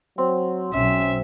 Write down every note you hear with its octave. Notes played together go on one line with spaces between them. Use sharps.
F#3 C4
B1 F#3 C#4 E5